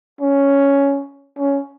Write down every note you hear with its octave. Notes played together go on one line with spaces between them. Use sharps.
C#4
C#4